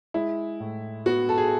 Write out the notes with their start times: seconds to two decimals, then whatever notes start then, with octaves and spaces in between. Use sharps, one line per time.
0.14 G#3 E4
0.60 A2
1.06 B3 F#4
1.29 A4
1.38 G#4